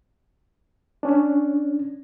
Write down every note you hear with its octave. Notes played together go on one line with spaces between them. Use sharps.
C#4 D4